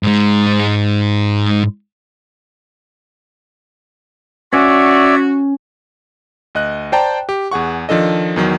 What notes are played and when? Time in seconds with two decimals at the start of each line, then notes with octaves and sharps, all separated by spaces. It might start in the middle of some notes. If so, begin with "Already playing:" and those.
0.03 G#2 G#3
4.53 C#4 F#4 C#5 D5 E5
6.55 D2 D#5 F#6
6.92 C5 D5 G5 A5 A#5
7.29 G4
7.51 E2 G#4 F#5 C#6
7.89 D#3 F3 D4 A4 D#5
8.36 E2 D#3 F#3